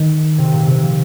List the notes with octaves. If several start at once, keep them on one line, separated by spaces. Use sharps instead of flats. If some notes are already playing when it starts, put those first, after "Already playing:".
Already playing: D#3
C3
A#2
C3
F3